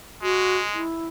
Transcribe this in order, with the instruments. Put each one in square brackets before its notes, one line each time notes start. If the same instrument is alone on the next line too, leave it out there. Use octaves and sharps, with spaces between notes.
[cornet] G#3 [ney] F#4
[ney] E4